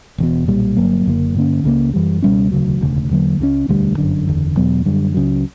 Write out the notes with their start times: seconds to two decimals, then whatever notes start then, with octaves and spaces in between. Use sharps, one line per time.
0.18 E1 E2 B2
0.47 B1 A#2 G3
0.76 G1 G2 F#3 A#3
1.06 F#1 F#2 D3 A#3
1.35 G2 D3 A#3 C#4
1.64 C#2 C#3 G3 A#3
1.94 F#2 E3 G3
2.22 C#2 B2 G3 C#4
2.52 E1 D2 C#3 F#3
2.81 E1 D2 C#3
3.10 E2 D3 F#3 A#3
3.39 C#2 C#3 G3 C#4
3.68 E1 D2 D3 G3
3.98 G1 F#2 D3
4.27 F#1 E2 D3
4.57 E2 B2 F#3 B3
4.85 F#2 D3 G3
5.14 C#2 C#3 F#3